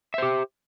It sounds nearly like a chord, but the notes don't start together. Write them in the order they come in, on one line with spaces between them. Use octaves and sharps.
E5 C5 G4